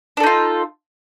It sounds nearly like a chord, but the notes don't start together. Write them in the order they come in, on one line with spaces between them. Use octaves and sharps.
D4 A4 D#4 F4